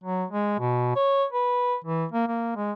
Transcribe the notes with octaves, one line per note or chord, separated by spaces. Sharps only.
F#3
G#3
B2
C#5
B4
E3
A#3
A#3
G#3